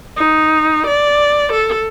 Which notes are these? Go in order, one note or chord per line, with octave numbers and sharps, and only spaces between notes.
D#4
D5
A4